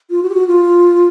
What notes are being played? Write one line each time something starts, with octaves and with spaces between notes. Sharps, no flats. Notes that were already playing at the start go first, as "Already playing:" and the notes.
F4
F#4
G4
F#4
F4